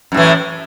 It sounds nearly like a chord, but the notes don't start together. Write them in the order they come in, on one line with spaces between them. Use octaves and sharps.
F#2 A2 E3